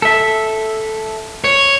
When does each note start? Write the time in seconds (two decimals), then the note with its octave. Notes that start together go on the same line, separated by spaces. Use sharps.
0.02 A4 E5
1.44 C#5